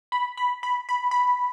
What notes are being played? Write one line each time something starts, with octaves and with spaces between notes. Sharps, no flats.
B5
B5
B5
B5
B5